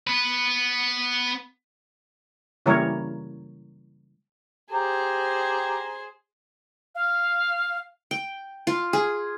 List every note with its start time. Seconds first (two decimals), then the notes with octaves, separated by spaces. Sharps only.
0.07 B3 B4
2.66 C#3 E3 G3 A#3 A#4 C#5
4.71 G4 G#4 C5 A#5
6.95 F5
8.11 G5
8.67 F4
8.93 G#4